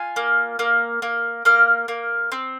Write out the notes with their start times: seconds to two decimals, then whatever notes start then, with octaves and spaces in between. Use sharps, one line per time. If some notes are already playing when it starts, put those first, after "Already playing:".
Already playing: F4 G#5
0.16 A#3
0.59 A#3
1.02 A#3
1.45 A#3 F6
1.88 A#3
2.32 C4